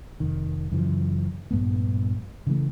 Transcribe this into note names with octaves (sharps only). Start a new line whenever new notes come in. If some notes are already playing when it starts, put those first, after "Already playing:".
F1 D#3
F#2 C#3 E3 F3
A#1 G2 A3 B3
C#3 E3 A3